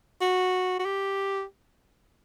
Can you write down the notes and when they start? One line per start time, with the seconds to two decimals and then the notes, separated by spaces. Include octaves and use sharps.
0.21 F#4
0.79 F#4
0.86 G4